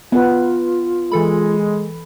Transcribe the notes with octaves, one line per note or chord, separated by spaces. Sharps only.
B3 F4 B4
E3 G#3 A4 B5